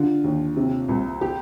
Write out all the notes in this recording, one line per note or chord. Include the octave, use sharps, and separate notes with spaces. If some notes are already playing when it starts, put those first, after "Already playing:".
Already playing: D3 F4
D#2
C3
C2
G4